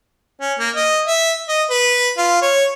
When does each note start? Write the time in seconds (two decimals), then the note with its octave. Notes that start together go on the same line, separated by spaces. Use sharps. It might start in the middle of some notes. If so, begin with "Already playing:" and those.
0.40 C#4
0.59 A#3
0.76 D#5
1.07 E5
1.48 D#5
1.70 B4
2.18 F4
2.42 C#5